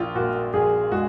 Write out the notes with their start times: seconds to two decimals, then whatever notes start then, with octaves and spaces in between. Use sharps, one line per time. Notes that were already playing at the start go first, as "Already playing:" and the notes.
Already playing: A#1 F4
0.15 A#2 F#4
0.53 A#1 G#4
0.92 G#3 F#4